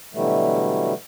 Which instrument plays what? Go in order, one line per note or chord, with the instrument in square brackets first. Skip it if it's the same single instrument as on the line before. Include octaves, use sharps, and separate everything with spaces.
[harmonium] B2 D3 E3 F#3 G3 A3